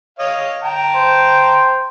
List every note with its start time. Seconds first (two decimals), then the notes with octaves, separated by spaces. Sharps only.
0.19 C#5 D#5 F5
0.63 G5 A5 A#5
0.95 C5